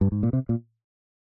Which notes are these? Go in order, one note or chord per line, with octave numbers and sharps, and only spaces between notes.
G2
G#2
A#2
C3
A#2